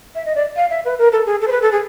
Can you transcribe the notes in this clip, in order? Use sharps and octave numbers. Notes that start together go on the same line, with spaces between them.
E5
D#5
D5
F5
E5
B4
A#4
A4
G#4
A4
C5
B4
A4
G#4